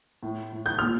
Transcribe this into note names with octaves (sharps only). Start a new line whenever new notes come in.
A2
A2
G6
A#2 F6